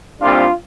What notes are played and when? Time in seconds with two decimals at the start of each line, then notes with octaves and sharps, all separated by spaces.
0.21 C2 A#2 G3 C4 D4 F4